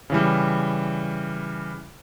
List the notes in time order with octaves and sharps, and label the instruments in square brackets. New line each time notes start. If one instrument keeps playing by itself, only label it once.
[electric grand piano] C#3 E3 G3